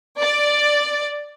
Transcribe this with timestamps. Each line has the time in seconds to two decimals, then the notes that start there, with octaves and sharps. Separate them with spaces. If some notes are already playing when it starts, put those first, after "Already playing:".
0.20 D5